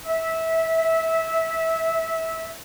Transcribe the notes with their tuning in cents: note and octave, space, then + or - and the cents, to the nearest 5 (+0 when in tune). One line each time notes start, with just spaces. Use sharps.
E5 -20